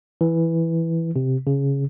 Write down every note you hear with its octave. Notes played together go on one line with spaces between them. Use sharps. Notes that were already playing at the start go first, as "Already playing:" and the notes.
E3
C3
C#3